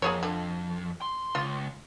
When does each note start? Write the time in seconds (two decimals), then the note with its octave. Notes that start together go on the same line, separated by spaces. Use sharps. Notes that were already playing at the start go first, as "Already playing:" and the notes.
0.02 F2 A#3 G#4 C#5
0.23 D3
1.01 C6
1.35 C#2 F4